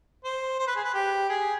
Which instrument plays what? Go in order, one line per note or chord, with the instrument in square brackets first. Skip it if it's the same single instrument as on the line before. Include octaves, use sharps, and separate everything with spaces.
[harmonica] C5
C5
B4
G#4
B4
G4
G#4